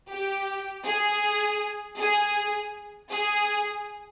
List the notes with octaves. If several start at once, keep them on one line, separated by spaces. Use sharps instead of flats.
G4
G#4
G#4
G#4